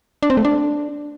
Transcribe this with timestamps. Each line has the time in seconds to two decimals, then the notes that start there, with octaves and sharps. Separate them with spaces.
0.23 D4
0.30 C4
0.37 A3
0.45 D4